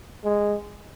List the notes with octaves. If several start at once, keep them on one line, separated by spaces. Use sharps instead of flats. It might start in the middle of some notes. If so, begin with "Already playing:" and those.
G#3